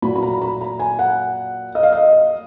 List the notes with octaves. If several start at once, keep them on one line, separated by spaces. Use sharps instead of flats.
A#2 F#3 B5
B5
A#5
A#5
B5
A#5
G#5
F#5
D#5
F5
D#5